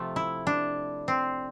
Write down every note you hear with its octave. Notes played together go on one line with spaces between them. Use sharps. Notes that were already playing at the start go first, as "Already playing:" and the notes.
Already playing: C3 F3 A3
E4
D4
C4